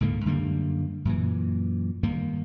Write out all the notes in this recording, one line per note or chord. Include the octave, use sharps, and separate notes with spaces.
C#2 G#2 D3 A#3
F#2 D3 G3 A#3
F#2 A#2 E3
G2 D#3 A#3